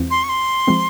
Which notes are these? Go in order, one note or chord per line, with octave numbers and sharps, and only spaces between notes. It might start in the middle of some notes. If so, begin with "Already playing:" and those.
Already playing: E2 E3 G#3 C4 F4
C6
C#6
C6
F3 G#3 C4